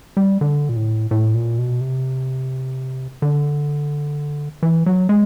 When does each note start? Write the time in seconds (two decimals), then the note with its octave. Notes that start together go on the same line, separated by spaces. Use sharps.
0.17 G3
0.41 D3
0.69 A#2
0.76 A2
1.11 A2
1.34 A#2
1.58 B2
1.81 C3
3.22 D3
4.62 E3
4.86 F#3
5.09 G#3